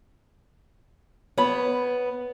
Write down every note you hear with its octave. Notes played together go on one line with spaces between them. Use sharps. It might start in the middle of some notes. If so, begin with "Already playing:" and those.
B3 C#5 B5